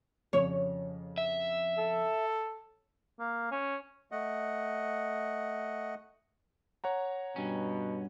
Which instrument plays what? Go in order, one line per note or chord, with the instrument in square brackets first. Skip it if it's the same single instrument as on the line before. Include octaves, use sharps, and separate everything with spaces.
[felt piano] F2 C#3 [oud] C#5
[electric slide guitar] E5
[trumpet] A4
[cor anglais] A#3
C#4
[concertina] A3 D#5 F#5
[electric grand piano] C#5 F#5 A#5
[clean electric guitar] G2 C#4 [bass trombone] B2